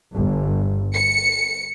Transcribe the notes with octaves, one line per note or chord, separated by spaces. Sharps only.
G1
C#7